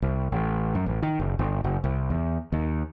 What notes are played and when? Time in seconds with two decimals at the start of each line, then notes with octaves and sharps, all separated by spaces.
0.02 C2
0.32 A1
0.75 F#2
0.86 A1
1.03 D#3
1.20 F#1
1.39 G1
1.64 F#1
1.84 C2
2.10 E2
2.52 D#2